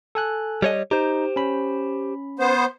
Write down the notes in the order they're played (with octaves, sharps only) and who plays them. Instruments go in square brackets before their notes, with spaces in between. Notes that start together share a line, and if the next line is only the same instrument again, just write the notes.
[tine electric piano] A4 G#5 F#6
[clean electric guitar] G3 C#5 D#5
[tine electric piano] D#4 [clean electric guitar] G4 C5
[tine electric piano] C#4 B5
[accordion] B3 C5